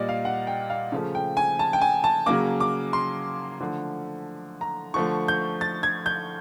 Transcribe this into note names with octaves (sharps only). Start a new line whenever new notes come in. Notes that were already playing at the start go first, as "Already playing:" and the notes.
Already playing: A#2 G3 A#3 D5 D#5
F5
F#5
G5
F5
C#3 F3 A3
G5
G#5
A5
G5
G#5
A5
C#3 F#3 A#3 D6
D6
C6
D3 F3 A3
A#5
D3 F3 A3 C#6
G6
A6
G#6
G6